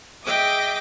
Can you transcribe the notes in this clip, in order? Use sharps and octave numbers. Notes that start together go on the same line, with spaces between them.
G#4 D#5 E5 G5 D6 D#6